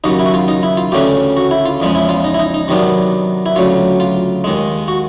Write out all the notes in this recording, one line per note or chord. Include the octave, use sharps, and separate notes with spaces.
D#2 C#3 F#3 D#4
E4
F#4
F4
D#4
E4
F4
D2 C#3 E3 A3 C#4 G4
F#4
E4
F4
E2 C#3 F3 G#3
E4
F4
D#4
E4
D#4
D#4
C3 D#3 F#3 B3 D4
E4
D2 C#3 F#3 F4
F4
D#2 D#3 G#3
F#4